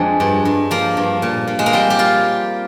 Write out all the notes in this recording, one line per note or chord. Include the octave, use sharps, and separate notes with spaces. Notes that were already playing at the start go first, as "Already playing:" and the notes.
Already playing: F2 G#3 C4 D4
G2
G2
F3 A#3
G2
A#2
A#2
G#3
A#3
G3 C4
G4
G3 F4